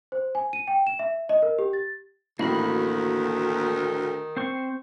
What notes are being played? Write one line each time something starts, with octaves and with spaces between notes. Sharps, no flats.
C5
G#5
D#7
G5
E7
E5
D#5
A#4
G4
A6
A1 D2 D#3 A#3 F#4 B5
C4 C5 C#6